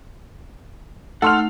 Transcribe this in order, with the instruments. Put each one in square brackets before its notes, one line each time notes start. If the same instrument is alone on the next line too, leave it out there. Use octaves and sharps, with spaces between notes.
[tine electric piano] A3 D#4 [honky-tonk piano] A4 C6 F7 [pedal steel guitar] F#5 F6